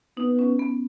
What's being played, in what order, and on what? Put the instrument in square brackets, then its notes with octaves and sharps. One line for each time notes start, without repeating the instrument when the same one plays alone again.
[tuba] B3 [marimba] D#4
[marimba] C#4
B3